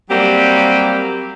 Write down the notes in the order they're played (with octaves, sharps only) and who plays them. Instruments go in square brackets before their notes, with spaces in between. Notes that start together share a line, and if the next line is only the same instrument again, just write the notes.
[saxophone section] F#3 G3 A#3 C4 G4